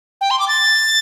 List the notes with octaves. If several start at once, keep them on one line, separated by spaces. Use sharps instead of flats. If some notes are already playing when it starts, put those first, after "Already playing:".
G5
C6
D6
A6